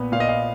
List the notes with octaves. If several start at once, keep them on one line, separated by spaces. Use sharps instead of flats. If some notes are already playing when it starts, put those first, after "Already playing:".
Already playing: A#2 B3
A#2 F5
D#5
F5